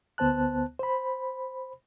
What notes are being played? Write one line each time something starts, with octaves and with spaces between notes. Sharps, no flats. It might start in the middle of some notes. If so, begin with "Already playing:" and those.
D2 B3 C5 A5 F#6
C5 B5